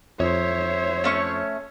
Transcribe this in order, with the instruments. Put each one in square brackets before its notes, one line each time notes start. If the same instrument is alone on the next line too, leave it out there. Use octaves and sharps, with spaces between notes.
[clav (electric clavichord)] F2 [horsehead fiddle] C5 E5 [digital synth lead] C#5
[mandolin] A3 C#4 C#6